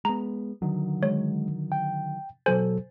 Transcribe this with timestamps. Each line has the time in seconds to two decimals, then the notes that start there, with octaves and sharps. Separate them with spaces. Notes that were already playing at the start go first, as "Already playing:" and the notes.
0.05 G#3 B3 A#5
0.62 D3 D#3 F#3
1.03 G#3 C#5
1.72 G5
2.46 B2 F#3 A4 C5 G#5